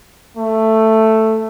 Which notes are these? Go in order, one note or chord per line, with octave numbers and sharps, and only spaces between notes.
A3